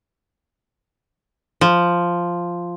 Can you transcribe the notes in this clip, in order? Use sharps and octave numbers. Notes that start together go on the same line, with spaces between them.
F3